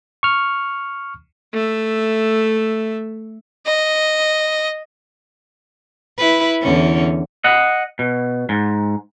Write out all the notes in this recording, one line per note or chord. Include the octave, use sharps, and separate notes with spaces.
C#6 F6
A3 E5
D#5
E4 B4
E2 D3 C#4
D#5 F#5
B2
G#2